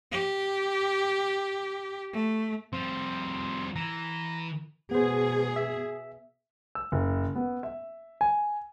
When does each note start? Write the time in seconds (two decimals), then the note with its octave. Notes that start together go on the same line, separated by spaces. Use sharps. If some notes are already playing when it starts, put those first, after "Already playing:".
0.12 G4
2.13 A3
2.73 F3 G3 C4
3.76 E3 A#5
4.91 B2 B3 G#4 C5
5.56 E5
6.75 E6
6.92 F#1
7.35 B3
7.63 E5
8.21 G#5